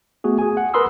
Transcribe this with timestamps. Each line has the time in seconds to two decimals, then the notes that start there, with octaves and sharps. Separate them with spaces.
0.24 A3 B3 F#4 G#4
0.39 G#4 G#5
0.57 F#5
0.74 A#4 B4 B5 C6 D#6 E6